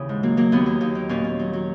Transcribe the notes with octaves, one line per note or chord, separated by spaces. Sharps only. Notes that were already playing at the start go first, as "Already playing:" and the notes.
Already playing: D#2 C#3 E3
G#2
F#3 A#3
F#3 A#3
D#2 B3
F#3
D#2
D#3
A#2 C#4
A#2
F#3
F#3